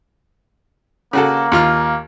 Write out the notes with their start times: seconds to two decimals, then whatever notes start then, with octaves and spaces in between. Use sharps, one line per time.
1.13 C#3 A#3 F#4 A4
1.52 D#2 F4 F6